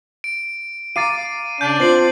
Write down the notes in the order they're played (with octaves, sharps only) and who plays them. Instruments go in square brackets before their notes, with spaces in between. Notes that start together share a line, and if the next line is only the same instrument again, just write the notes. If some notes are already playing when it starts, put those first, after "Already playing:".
[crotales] D7
[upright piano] F5 A#5 D6 [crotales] A6 C7 D#7
[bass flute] C#3 [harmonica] D4 [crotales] G6
[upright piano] C4 [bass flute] F4 [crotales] C7 F#7